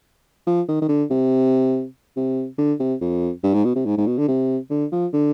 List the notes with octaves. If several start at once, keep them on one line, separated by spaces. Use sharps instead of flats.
F3
D#3
D#3
D3
C3
C3
D3
C3
F2
G2
G#2
B2
C3
G#2
G#2
B2
D3
C3
D3
F3
D3